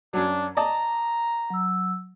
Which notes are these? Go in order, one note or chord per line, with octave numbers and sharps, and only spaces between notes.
F#2 F#3 D4
D5 D#5 A5 A#5
F#3 E6